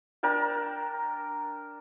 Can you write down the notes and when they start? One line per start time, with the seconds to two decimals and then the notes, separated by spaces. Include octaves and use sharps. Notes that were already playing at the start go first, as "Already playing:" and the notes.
0.23 D4 A#4 G5 A5